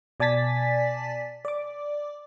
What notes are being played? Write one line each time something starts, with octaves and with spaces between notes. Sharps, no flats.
B2 D5 G#5 A5 A6 B6
D5 D6